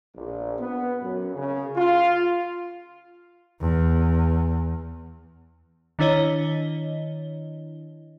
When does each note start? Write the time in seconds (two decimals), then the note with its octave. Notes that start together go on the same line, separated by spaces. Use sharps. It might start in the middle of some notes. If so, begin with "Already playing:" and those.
0.15 A#1
0.58 B3
1.01 F#2
1.35 C#3
1.76 F4
3.61 E2
5.99 D#3 D4 E4 C#5 D#5 G7